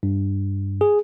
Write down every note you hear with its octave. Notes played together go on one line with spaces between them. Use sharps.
G2
G#4